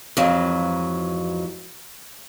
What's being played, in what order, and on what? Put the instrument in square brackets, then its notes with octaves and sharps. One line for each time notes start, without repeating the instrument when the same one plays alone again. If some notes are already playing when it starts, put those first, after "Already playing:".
[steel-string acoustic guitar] F2 G#2 E3 F#3